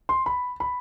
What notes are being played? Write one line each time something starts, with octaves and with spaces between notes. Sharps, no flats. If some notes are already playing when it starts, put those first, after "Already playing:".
C6
B5
B5